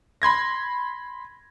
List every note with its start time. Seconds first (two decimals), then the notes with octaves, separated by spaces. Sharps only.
0.22 B5 C6 G#6 A#6